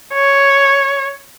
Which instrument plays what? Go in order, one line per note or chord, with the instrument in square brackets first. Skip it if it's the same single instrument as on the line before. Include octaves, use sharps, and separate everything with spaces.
[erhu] C#5